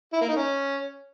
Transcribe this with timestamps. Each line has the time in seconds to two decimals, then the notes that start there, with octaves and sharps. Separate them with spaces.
0.13 E4
0.21 A#3
0.29 D#4
0.36 C#4